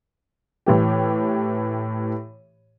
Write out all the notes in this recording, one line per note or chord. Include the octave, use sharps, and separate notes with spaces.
A2 E3 G4